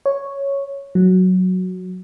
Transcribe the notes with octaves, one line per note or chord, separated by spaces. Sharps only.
C#5
F#3